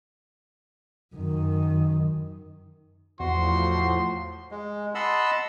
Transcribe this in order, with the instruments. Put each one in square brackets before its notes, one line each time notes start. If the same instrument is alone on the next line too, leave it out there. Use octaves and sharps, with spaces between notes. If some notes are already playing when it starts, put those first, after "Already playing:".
[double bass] F#2 D#3
[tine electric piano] E2 [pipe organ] A2 F3 [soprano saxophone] F#4 [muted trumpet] C6
[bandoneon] G#3
D#5 F#5 A5 B5 C6 E6